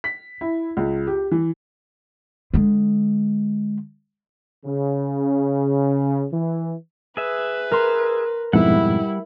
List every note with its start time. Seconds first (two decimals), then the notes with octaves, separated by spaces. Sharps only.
0.04 B6
0.41 E4
0.77 C#2
1.07 G4
1.31 E3
2.54 D3 G#3
4.66 C#3
6.32 E3
7.17 G#4 B4 E5
7.71 A#4 C6
8.53 F2 G#2 B2 G3 E4 F#5